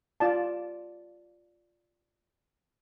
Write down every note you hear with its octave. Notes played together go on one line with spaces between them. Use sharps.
F4 D5 A5